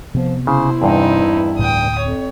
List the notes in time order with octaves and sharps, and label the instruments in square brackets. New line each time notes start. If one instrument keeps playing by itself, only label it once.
[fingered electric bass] C3 B3 [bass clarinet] F3
[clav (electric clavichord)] C#3 [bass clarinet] E4 [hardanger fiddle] C5
[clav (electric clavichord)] E2 G2 [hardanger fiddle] C4 D#4
[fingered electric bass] D2 A2 [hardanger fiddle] G5 D#6
[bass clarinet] F2 [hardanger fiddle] C#5